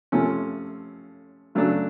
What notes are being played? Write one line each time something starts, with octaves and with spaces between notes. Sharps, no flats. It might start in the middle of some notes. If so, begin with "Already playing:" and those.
C3 F3 A3 C#4
C#3 F#3 A3 D4